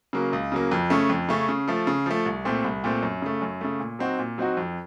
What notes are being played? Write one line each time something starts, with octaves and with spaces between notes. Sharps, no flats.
C#3 F#3 A#3
C#2
C#3 F#3 A#3
F2
C#3 A3 C#4
F2
C#3 A3 C#4
C#3
F3 A3
C#3
F3 A3
C2
A#2 A3 C4
C2
A#2 A3 C4
F#2
C#3 A3
F#2
C#3 A3
A#2
F#3 C4 D#4 F#4
A#2
F#3 C4 D#4 F#4
F2